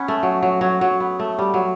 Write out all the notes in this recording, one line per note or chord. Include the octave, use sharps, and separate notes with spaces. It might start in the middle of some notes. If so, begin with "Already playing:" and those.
Already playing: B3 C#4
A3
F#3
F#3
F#3
F#3
B3
A3
G3
F#3